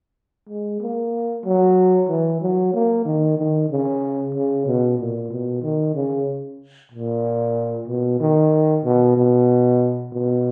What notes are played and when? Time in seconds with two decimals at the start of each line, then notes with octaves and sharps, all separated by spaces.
0.49 G#3
0.81 A#3
1.45 F#3
2.09 E3
2.41 F#3
2.74 A#3
3.05 D#3
3.38 D#3
3.70 C#3
4.34 C#3
4.67 B2
4.99 A#2
5.31 B2
5.63 D#3
5.95 C#3
6.92 A#2
7.88 B2
8.20 D#3
8.84 B2
9.17 B2
10.13 B2